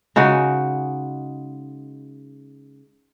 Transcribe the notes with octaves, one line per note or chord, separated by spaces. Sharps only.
C#3 G#3 D#4 F#4